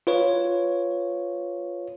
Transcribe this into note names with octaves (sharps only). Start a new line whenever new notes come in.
F4 B4 C#5